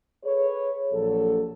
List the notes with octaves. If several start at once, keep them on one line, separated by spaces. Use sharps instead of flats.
G#4 A4 B4 C#5
A#1 F#3 A4